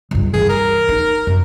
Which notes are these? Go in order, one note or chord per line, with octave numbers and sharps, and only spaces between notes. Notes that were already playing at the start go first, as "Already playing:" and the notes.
C#2 G2
G2 E3 G#4
A#4
D#4
F#2